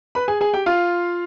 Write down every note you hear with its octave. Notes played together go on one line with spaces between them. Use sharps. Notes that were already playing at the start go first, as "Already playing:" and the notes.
B4 B5
G#4 G#5
G#4 G#5
G4 G5
F4 F5